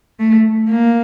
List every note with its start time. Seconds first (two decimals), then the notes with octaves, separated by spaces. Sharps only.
0.19 A3
0.69 A#3